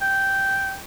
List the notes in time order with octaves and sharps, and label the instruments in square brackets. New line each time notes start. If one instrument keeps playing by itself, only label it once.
[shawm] G5